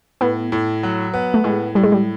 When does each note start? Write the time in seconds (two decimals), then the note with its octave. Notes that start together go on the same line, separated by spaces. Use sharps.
0.21 A2 B3
0.52 A2
0.83 F#3
1.14 B3
1.34 A3
1.44 A2 G#3
1.75 A2 G3
1.83 G#3
1.92 G3